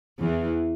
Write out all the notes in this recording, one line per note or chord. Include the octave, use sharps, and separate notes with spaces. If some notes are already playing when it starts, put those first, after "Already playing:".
E2 E3